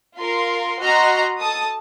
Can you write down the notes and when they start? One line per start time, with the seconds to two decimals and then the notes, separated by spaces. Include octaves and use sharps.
0.17 F4 A#4 C6
0.80 F#4 D#5 F#5 A#5 C6 F6
1.39 A4 A5 D#6